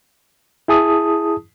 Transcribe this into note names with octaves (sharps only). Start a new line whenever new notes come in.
E4 G#4 A5 D#6